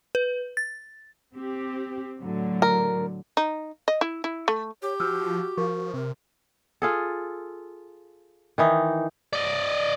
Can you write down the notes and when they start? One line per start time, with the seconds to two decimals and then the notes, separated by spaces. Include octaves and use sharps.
0.15 B4
0.57 A6
1.34 C4 G4
2.19 A2 D3 F#3
2.62 A#4
3.37 D#4
3.88 D#5
4.01 E4
4.24 E4
4.48 A3
4.82 G4 C#5
5.00 F3 F#4 E6 F6 G6
5.58 F3 A#4 C#6
5.94 C3 A#4
6.82 F4 G#4 A4
8.58 D#3 E3 D#4
9.33 D5 D#5